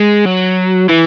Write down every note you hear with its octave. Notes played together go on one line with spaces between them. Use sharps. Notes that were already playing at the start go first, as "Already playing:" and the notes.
Already playing: G#3
F#3
E3